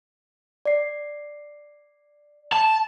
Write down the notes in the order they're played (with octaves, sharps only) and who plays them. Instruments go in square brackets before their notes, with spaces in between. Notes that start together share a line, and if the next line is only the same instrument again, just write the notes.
[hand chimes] D5 C7
[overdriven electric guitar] A5